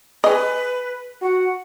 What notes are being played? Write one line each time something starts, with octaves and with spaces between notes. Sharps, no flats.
G#4 B4 D#5
F#4 F#5